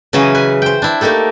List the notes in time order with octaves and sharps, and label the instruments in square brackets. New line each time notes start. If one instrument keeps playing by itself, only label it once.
[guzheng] C#3 E3 F#3 C#4 G#4 D#5
B4 G#5
C5 G5
D4 E4
A3 A#3 D#4 G4 A4